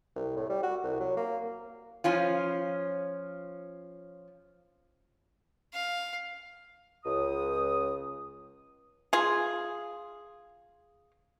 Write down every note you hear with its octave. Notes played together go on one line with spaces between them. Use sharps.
C2
A2
G3
F#4
C2
F#3
A#3
F3 C#4 F4
F5
C#2 D#6
F4 G#4